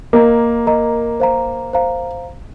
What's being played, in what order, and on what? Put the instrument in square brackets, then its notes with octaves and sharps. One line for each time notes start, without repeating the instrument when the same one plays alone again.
[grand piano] A#3 [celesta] A#4 D#5 A#5
[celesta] A#4 D#5 A#5
C5 F5 A#5
C5 F5 A#5